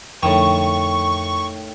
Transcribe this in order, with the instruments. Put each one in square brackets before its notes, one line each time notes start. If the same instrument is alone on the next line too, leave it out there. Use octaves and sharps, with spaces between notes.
[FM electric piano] F2 D3 [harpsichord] A2 D#3 [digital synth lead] C#6